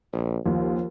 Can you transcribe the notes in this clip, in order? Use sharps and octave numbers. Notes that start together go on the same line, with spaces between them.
A#1
D#2 F3